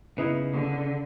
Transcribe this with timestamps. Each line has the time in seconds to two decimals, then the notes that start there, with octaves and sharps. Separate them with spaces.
0.18 C#3 B3 D#4 E4
0.53 D3